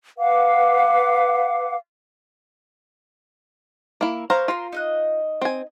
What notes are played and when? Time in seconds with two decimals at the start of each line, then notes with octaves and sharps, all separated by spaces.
0.18 B4 F5 F#5 D6
4.01 A#3 E4
4.30 B3 A#4 C5 C#5 F5 A#5
4.48 F4 A#4 C5 C6
4.72 D#4 D#5 F#6
5.41 C4 G#5